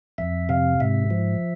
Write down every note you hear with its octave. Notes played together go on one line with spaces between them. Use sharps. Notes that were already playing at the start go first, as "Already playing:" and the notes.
F2 E5
C3 F5
G#2 E5
F3